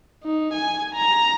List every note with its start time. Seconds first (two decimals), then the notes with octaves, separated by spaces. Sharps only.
0.24 D#4
0.54 G#5
0.95 A#5